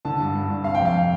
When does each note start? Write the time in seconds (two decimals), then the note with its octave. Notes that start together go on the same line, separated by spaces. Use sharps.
0.05 D3 A5
0.20 G2
0.35 G2
0.50 G2
0.64 C3 F5
0.75 F2 G5
0.85 F5